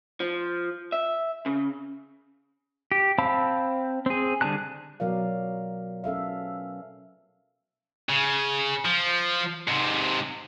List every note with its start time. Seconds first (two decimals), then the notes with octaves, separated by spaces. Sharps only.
0.20 F3
0.92 E5
1.46 C#3
2.92 G4
3.18 C4 F5 A5 B5 E6
4.06 C4 G#4
4.41 D3 G3 G#4 A5 F#6
5.00 B2 F#3 A#4 D5 F5
6.04 C#4 A4 E5 F5
8.09 C#3
8.85 F3
9.68 G#2 C3